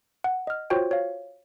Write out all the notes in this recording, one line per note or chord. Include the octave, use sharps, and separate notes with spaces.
F#5
D#5 F6
F4 F#4 C5 C#5 G5
C#5 F5